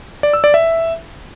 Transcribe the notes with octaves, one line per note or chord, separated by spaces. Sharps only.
D5
E6
D5
E5